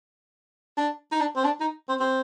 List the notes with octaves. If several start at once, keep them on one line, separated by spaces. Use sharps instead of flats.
D4
D#4
D4
C4
D4
D#4
C4
C4